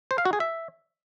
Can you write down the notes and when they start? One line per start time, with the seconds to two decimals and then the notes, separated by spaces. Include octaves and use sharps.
0.11 C5
0.18 F5
0.25 F#4
0.33 G#4
0.40 E5